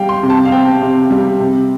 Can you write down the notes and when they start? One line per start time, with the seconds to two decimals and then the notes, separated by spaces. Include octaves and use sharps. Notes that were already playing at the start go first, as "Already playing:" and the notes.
Already playing: G3 F5 G5
0.09 C6
0.23 C3
0.30 A5
0.45 F5
0.52 C4 G5
0.82 C3
1.11 G3
1.40 C3